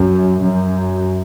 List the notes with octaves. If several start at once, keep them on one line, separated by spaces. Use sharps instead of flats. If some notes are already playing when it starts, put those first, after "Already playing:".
Already playing: F#2
F#2